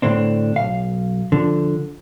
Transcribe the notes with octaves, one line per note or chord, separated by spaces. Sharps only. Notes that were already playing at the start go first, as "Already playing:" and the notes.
A2 D3 C4 D4
B1 F5
D3 F3